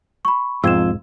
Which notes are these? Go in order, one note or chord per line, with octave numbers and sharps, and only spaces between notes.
B5 C#6
E1 F2 G#2 F4 E6 G#6 E7